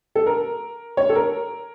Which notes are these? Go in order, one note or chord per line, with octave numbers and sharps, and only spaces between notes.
A4
A#4
C#5
A4
A#4